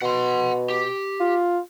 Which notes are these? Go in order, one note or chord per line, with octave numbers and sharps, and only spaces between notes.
B2 F#5 C6
G4
F4